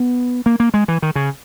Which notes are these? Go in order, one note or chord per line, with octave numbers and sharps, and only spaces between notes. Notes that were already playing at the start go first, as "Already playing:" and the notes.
Already playing: B3
A#3
A#3
G#3
E3
D#3
C#3